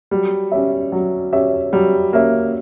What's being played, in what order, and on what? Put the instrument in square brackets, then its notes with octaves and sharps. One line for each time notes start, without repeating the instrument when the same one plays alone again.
[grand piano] F#3 [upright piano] G3
[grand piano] C#4 G4 C#5 E5
F#3
C#4 G4 C#5 E5
[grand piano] F#3 [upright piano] G3
[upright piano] A#3 [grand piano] C#4 G4 C#5 E5